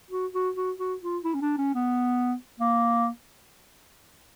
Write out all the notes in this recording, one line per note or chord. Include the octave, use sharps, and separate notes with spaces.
F#4
F#4
F#4
F#4
F4
E4
C#4
D4
C#4
B3
A#3